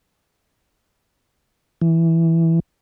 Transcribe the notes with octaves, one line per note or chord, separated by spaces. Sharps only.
E3